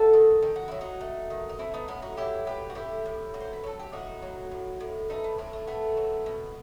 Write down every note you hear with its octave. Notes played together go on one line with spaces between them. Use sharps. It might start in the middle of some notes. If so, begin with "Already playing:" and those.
Already playing: A3 F#4 A4
D#3
D#3 G4
F#4
F#3 E4
D#4 F#4
A3
D#3
D#4
A3 C4 E4
B3 D#4
A2 B3
D#4 F#4
F#3 E4 G4
A2 G4 B4
F#4
A2 E4 G4
A2
F#3
C5
B4
F#3 A4
G4
A2 D#4 F#4
F#3
A2
A2
A3 B3 D#4
B3
A2 A3 C4
A3
A3 B3
F#3
B2